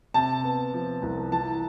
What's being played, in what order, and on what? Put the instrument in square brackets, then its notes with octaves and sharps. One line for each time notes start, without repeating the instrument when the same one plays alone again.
[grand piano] C3 A5
B3
F3
C2
E3 A5